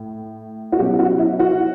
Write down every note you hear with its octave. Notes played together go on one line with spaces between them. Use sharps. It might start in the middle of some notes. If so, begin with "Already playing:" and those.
Already playing: A2
F#4
B2 F#3 C#4 G4
F#4
E4
F#4